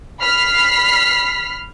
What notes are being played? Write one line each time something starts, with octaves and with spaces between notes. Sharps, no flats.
B5 F6 B6 C7